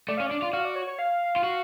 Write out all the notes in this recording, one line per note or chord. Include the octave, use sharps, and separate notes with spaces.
A3 D5
C#4 F5
D4 D5
F4
F#4 F5
D5
C#5
C#5
F5
F4
F#4